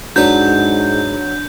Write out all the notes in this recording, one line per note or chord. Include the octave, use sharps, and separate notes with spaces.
G#2 F#3 D4 B4 G6